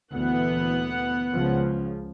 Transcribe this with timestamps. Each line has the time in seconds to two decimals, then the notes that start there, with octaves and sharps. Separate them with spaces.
0.13 D2 A#2 E3 B3 F#5
1.34 C#2 C#3 F3